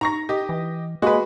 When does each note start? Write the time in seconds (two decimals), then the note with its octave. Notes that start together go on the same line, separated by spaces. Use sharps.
0.01 D#4 A#5 C#6 A#6
0.29 G4 D#5
0.49 E3
1.02 G#3 A#3 F#4 B4